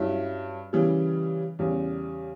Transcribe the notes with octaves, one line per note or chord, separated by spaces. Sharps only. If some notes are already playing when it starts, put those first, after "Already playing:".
Already playing: G2 F#3 C#4 E4
C#3 E3 G3
E2 C#3 G3